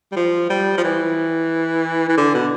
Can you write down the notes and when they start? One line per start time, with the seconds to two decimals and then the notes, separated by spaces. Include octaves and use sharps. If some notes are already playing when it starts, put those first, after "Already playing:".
0.12 G3
0.16 F3
0.50 G3
0.77 F3
0.84 E3
2.09 E3
2.18 D3
2.34 B2